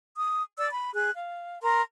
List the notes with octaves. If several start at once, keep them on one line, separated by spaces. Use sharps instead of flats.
D#6
D5 E6
B5
G#4 F#6
F5
A#4 A#5 C6